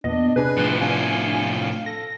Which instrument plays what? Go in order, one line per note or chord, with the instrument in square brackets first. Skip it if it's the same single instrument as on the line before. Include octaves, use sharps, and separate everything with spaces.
[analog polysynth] E2 A#2 B3 [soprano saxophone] D4 [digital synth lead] D#5
[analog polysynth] C3 D4 [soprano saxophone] G#4 [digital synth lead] B4
[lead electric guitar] A2 F3
[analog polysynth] C3 D4 [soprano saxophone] F5 [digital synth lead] G#5
[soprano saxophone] A4 [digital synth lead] A#6